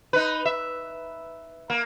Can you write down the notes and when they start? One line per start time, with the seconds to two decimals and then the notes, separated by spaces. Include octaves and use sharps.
0.13 D#4 B4
0.45 E5
1.70 A#3